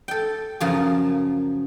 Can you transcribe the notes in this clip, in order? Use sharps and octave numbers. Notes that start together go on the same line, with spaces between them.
A4 G5
F#2 C#3 F3 A#4 A5